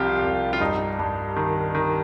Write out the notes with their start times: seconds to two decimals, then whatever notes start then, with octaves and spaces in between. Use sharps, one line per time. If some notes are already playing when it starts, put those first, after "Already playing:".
Already playing: C2 C3 F3 F4 G4
0.22 C2
0.53 F4
0.60 G2 D#4
0.99 G2
1.36 D#3
1.75 D#3